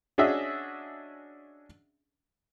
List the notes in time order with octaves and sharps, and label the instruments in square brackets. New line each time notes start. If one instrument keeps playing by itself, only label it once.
[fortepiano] C#4 D4 F#4 G#4 D#5 E5